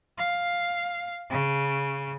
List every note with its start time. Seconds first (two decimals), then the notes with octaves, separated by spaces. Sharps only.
0.18 F5
1.30 C#3